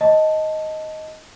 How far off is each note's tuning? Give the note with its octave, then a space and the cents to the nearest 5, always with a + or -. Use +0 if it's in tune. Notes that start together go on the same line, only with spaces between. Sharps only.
D#5 +5 A5 +0